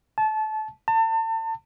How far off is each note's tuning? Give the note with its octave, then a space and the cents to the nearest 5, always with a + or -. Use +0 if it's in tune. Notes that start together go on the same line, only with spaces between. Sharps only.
A5 -25
A5 +35